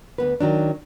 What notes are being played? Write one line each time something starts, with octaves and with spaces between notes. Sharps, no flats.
D2 B3 B4
D#3 F#3 D4